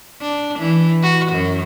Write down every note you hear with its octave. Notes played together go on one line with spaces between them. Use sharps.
D4
E3
F#4
F#2